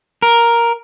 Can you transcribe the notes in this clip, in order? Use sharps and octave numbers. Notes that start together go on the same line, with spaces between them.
A#4